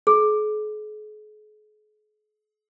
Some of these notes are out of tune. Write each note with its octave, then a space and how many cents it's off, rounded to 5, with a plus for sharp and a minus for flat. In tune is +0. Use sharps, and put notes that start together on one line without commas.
G#4 +45